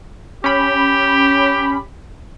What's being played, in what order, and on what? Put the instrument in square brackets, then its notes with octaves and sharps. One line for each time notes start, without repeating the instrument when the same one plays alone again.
[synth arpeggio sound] C#4 B5 [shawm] G4